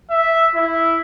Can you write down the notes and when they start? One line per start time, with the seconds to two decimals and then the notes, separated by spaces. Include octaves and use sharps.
0.10 E5
0.55 E4